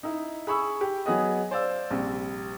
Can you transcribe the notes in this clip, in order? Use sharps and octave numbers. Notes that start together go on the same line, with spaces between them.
D#4 E4
G#4 B5 C#6 E6
G4
F#3 B3 G#4 D#5
C5 D5 F5 E6
A#1 C3 G3